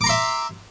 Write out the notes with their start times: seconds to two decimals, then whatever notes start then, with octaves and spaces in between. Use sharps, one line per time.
0.01 D6
0.04 A#5
0.07 C6
0.09 E5